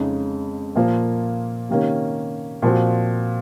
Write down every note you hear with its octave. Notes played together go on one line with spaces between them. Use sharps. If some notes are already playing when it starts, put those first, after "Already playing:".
Already playing: F2 C#3 G#3 D#4
A#2 F3 A#3 F4 C5
C3 D#3 A#3 C#4
A#2 F3 C4 F#4